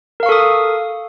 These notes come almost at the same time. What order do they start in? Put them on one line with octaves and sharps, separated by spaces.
A#4 F5 C#6 A4 D#6